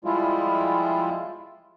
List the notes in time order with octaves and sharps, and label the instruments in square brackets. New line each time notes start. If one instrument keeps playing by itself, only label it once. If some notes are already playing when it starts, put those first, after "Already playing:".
[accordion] F3 G3 G#3 E4 F4